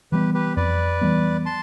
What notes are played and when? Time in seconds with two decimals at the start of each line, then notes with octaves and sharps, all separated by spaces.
0.12 E3 G3 B3 G4 B4
0.34 G4 B4
0.56 F2 B4 D5
1.01 E3 G3 B3
1.46 A5 C6